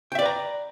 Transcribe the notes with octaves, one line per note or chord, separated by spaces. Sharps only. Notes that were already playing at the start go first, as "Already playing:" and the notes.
B4 D5 E5 G5 A#5